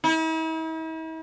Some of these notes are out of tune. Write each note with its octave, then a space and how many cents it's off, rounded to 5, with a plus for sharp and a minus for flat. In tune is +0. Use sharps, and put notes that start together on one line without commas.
E4 -45